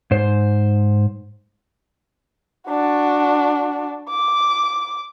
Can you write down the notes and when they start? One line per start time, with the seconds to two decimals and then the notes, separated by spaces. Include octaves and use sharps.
0.11 G#2 C5
2.68 D4 F#4
4.10 D6